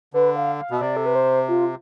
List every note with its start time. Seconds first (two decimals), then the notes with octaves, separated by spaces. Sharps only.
0.13 D3 B4
0.36 F5
0.59 F5
0.70 B2
0.77 E5
0.80 C3 D5
0.97 A4
1.06 B4
1.15 C5
1.48 F4